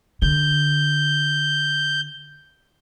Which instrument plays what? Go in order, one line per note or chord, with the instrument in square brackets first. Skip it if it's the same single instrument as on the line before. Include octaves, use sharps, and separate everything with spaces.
[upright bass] D3 [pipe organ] G6